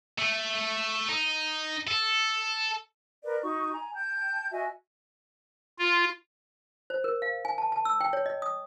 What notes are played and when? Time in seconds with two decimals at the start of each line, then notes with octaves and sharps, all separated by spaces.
0.19 A3
1.08 D#4
1.88 A4
3.23 A#4 B4 D5
3.42 D#4 F#4 C#6
3.71 G#5 A#5
3.93 G5 A5 G6
4.51 F#4 D#5 E5 G#5
5.79 F4
6.90 C5
7.04 A#4
7.22 F5
7.45 G#5
7.58 A5
7.72 A5
7.85 E6
8.01 G5
8.13 C#5
8.26 D#5
8.42 D#6